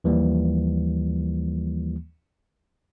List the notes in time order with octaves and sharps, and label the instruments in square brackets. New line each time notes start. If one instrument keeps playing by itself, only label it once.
[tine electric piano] D#2 E3 F3 G3 A#3